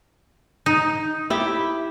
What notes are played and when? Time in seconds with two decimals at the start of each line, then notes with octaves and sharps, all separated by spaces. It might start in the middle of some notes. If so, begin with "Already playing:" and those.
0.66 D#4
1.30 E4 G4